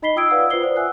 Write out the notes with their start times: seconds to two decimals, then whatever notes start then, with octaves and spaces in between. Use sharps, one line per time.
0.02 D#4 D#5 B5 B6 C7 G7
0.16 F4 G5 D#6 E6 G#6 D7
0.30 B4 D5 F5 F#5 E6
0.50 F4 B4 C5 D#6 C7 G7
0.63 C5 D5
0.76 E5 F#5 G#5 E6 F#6